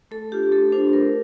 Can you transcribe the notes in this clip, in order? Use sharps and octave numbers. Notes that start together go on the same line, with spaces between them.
A3 A4
D4 F4 G4
A3 A4
D4 F4 C5
A3 A#4